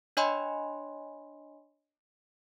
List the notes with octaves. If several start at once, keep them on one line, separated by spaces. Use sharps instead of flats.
D4 C#5 D#5 G#5 B5 C6